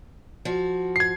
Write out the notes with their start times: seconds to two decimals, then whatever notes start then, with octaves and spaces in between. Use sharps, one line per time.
0.45 F3 F#4
0.96 G#6 C7